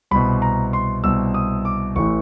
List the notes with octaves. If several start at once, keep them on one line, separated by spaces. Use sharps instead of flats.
C2 B2 B5
A#5
C6
C2 B2 E6
D#6
D6
A1 A2 E3 C#6